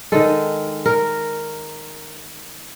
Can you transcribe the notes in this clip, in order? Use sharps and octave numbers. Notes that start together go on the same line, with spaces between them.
D#3 G#3 A4
A#4